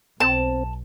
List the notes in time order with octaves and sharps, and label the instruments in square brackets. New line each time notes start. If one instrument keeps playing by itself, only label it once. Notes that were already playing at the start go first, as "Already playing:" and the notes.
[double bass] B1 [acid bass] C4 [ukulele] A5